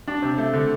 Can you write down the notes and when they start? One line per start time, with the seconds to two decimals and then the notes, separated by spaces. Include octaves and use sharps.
0.08 D4
0.22 C3
0.38 A3
0.53 D3